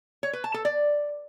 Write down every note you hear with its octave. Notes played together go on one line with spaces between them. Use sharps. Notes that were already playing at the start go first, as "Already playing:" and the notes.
C#5
B4
A5
A4
D5